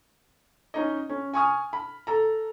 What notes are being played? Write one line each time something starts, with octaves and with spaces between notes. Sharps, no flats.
C#4 D#4 D#5
C#4
G#5 C#6 D#6 F6
B5
A4 A#5